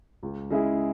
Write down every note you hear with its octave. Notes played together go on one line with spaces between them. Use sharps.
C#2
C#3 G#3 E4 G#4